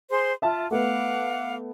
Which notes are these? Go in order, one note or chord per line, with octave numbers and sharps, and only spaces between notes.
G#4 C5 C6
F4 E5 A5
A3 B3 F5 F#5 D6